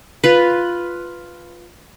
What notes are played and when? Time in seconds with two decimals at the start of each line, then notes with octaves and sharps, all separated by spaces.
0.24 F4 B4